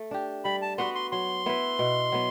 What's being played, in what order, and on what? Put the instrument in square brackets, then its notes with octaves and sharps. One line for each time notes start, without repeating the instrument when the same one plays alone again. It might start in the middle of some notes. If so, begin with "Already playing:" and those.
Already playing: [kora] A3
D4 G4
[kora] G3 [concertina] B5
[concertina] A5
[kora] B3 F#4 B4 [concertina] C6
[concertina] C6
[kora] F#3 [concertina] C6
[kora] B3 E4 B4
B2
F#3 B3